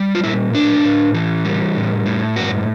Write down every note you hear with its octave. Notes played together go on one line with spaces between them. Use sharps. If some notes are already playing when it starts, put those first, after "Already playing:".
Already playing: G3
F4
A#2 E4
A2 D4
A2
E3
G3
A2
A2
G2 F#4